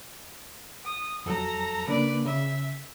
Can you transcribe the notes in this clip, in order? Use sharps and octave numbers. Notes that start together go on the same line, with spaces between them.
D#6
F2 F#3 A4 A#5
C#3 A#3 D4 B4 D5
C#3 E5